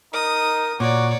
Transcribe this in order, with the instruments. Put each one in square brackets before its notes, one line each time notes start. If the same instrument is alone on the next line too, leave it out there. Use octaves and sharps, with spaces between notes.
[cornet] D#4 [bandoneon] A#4 [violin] D#6
[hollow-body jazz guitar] A#2 [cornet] F#4 [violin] C#5 D5 [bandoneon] D6